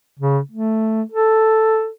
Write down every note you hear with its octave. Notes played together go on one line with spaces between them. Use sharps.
C#3
A3
A4